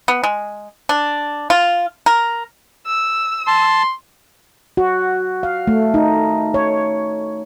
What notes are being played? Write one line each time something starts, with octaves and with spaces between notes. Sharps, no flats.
B3
G#3
D4
F4
A#4
E6
A5 C6
F#4
F5
A3
D#4
C#5